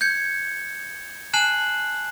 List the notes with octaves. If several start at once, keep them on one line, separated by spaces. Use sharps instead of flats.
G6 G#6 C#7
G#5 A5 F#6 C7 E7 F#7